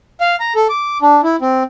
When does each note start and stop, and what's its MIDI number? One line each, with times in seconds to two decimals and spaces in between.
0.21 0.36 77
0.40 0.53 82
0.55 0.67 69
0.69 0.98 86
1.02 1.21 62
1.23 1.36 64
1.41 1.63 60